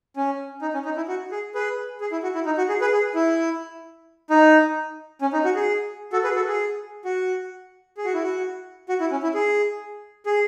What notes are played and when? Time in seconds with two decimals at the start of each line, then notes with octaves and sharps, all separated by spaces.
0.16 C#4
0.62 D#4
0.74 C#4
0.85 D#4
0.97 E4
1.08 F#4
1.32 G#4
1.55 G#4 B4
2.01 G#4
2.12 E4
2.23 F#4
2.35 E4
2.46 D#4
2.58 F#4
2.69 G#4
2.81 G#4 B4
2.92 G#4
3.15 E4
4.30 D#4
5.21 C#4
5.33 D#4
5.45 F#4
5.55 G#4
6.13 F#4 A4
6.24 G#4 B4
6.36 F#4 A4
6.47 G#4
7.05 F#4
7.97 G#4
8.05 F#4
8.14 E4
8.22 F#4
8.89 F#4
9.00 E4
9.11 C#4
9.23 E4
9.34 G#4
10.26 G#4